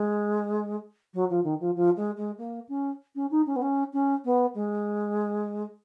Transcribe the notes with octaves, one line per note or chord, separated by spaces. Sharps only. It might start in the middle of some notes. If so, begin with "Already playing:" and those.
Already playing: G#3
F#3
F3
D#3
F3
F3
G#3
G#3
A#3
C#4
C#4
D#4
C#4
B3
C#4
C#4
B3
G#3